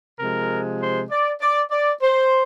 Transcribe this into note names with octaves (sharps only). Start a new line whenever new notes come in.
C3 F3 G#3 A#4
C5
D5
D5
D5
C5